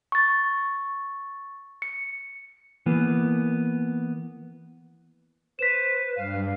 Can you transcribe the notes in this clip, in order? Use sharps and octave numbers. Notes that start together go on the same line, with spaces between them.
C#6 A6
C#7
E3 A#3 B3
B4 C5 B6 E7
G2 F5